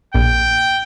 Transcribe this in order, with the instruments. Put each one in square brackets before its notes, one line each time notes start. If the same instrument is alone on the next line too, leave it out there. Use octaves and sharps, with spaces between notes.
[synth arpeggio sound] A#1 [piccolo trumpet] G5